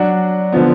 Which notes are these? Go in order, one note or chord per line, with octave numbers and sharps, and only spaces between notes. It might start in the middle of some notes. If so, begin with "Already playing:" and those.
Already playing: F#3 D4 F#4
D3 F3 B3